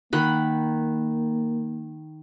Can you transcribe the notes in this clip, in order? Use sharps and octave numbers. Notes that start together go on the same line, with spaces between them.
D#3 A#3 F#5 B5